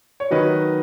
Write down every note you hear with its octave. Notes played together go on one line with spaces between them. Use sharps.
C#5
D#3 F#3 B4 D#5